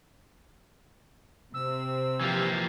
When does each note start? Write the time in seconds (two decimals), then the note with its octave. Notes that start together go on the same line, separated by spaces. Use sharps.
1.54 C3 C4 E6
2.21 E3 F3 A#3 F4 G4